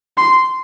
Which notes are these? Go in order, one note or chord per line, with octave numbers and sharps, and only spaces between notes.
C6